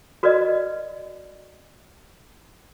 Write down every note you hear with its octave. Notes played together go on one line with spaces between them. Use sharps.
F#4 A#4 B4 D5 D#5